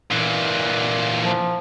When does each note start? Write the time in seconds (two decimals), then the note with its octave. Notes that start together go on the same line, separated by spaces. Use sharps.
0.11 A#2 E3
1.25 F3